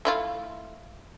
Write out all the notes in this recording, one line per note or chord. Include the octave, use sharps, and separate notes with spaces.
A3 E4 F4